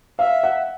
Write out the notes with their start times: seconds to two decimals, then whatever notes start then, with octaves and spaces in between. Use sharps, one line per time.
0.19 E5 F5
0.43 F#5